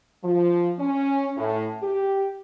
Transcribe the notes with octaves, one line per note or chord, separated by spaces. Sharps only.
F3
C#4
A2
G4